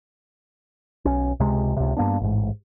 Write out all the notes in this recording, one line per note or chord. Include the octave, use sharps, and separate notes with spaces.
B1 C#4
C#2 C3 G#3
C#2 C3
G2 A#3 B3 D4
A1 G#2